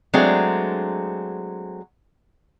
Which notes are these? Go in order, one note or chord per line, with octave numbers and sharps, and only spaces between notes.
F#3 G#3 A3 C4 D4 G#4